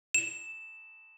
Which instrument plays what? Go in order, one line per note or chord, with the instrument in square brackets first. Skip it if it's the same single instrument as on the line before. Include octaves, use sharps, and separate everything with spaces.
[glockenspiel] E7